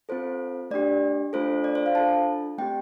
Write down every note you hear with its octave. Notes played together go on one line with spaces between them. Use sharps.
C4 F4 A4 C5
A3 D4 G4 D5
A3 D4 F4 A4 C5
D5
C5
F5
D4 F4 A4 A5
A3 C4 G4 G5